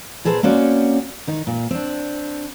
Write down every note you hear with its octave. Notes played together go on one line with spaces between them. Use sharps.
A#2 G#4 A4 B4 C5
A#3 C4 C#4 F#4 D5
D#3 D#4
A#2
C4 D4